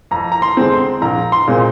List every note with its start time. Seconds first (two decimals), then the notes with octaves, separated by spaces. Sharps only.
0.11 F2 A#5
0.32 A#5
0.42 C6
0.57 D3 G#3 C4
0.72 C6
1.02 A#1 A#5
1.32 C6
1.47 A#2 G#3 C4